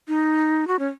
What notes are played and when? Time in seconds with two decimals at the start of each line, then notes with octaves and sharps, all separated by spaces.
0.08 D#4
0.67 F#4
0.79 C#4